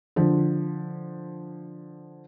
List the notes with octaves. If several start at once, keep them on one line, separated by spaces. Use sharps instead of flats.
D3 F3